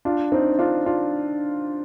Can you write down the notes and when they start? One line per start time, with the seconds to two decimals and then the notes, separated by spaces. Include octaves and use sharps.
0.05 D4 F4
0.32 C4 D#4
0.59 D4 F4
0.86 D4 F4